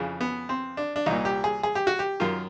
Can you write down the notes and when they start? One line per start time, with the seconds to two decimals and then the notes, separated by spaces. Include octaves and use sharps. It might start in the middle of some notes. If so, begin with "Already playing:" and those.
Already playing: F2 C#3 E3
0.21 B3
0.49 C4
0.77 D4
0.96 D4
1.06 C2 A#2 D#4
1.25 G4
1.44 G#4
1.63 G#4
1.75 G4
1.87 F#4
1.99 G4
2.20 F#2 D#3 F4